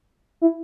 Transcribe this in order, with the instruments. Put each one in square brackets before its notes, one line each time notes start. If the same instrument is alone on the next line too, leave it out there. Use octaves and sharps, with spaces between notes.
[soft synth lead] E4